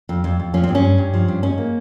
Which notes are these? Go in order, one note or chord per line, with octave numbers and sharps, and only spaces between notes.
F2
F2
F2
F3 C#4
C4
G2
C#4
G2
G2
F3
G2
G#2 C#4
A#3